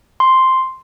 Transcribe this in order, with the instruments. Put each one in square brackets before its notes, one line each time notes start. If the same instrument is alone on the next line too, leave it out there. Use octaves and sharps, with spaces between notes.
[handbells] C6